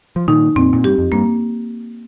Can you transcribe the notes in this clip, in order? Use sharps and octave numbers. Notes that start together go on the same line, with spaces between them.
F3
A#2 D#3 D#4
F2 A#2 C4
A#2
G2 G4
F2
G2 A#3